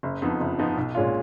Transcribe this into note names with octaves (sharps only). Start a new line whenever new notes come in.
F#1
F2 F3 B3 D#4
F#1
F2 F3 B3 D#4
B1
A#2 G#3 C#4 F4